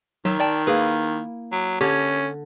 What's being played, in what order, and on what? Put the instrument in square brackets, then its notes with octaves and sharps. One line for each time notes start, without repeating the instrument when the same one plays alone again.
[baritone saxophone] D#3 [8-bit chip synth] F#3 [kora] E5
[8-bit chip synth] D5 G5 A5
[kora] A#3 E4 [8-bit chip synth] G#4 B4
[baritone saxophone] F#3
[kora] D3 [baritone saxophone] C#4 [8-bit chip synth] G4 G#6